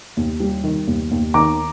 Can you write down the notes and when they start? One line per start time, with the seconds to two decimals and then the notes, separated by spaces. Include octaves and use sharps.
0.17 D#2
0.40 G3
0.64 D#3
0.87 D#2
1.11 D#2
1.34 D#3 A#5 D6